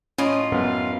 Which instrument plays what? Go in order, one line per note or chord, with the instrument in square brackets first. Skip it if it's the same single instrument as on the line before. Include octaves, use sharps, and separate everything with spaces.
[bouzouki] A2 F4 D#5 [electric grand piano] C#4
[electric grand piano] F#2 [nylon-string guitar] B3 [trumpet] F5